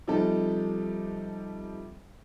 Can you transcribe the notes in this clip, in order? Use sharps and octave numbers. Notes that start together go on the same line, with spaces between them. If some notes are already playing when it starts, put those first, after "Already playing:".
C3 F3 G3 D#4 A4